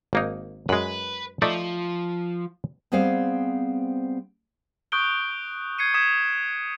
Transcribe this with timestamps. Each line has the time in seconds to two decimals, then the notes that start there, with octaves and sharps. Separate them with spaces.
0.13 G#1 A#3 D#4
0.69 F#2 G#3 B4
1.42 F3 A3 D#4 D5
2.92 G3 B3 C4 G#4 C5 F5
4.92 C#6 D#6 F#6 G6 D7 G7
5.79 G#6 C7 C#7 D#7
5.94 D#6 G#6 B6 E7